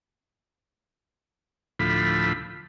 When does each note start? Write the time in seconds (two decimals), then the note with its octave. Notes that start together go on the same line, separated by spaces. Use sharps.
1.79 D2 A2 F3 B5